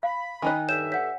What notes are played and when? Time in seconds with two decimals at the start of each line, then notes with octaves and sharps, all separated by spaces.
0.03 F5 B5
0.42 D#3 D#4 D#5 G#5 F#6
0.69 G2 A4 C#5 E5 E7
0.92 C#5 F#5 B6